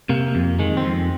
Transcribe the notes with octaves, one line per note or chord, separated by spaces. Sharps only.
C3 A#3
F2
D#3 G#3
C4
F2